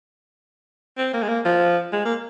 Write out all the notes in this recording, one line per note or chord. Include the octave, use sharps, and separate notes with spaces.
C4
A#3
G#3
A#3
F3
G#3
A#3